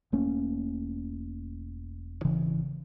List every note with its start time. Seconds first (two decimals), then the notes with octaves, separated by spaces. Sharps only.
0.12 E1 A3 A#3 C#4
2.24 G#1 C#3 E3